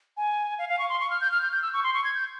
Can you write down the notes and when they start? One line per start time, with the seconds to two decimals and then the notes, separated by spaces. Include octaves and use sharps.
0.17 G#5
0.59 F5
0.69 F5
0.79 C#6
0.89 C6
1.00 C#6
1.10 F6
1.21 G6
1.31 F6
1.42 G6
1.53 G6
1.62 E6
1.73 C#6
1.84 C6
1.94 C#6
2.04 G#6
2.15 G6